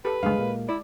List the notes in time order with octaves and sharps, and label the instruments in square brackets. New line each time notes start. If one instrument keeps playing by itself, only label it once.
[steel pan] G4 A4 [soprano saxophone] B4
[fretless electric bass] F#1 D2 G2 [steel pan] G#3 G#4 F5
[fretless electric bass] A#2 A#3
[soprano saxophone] E4 [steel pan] D5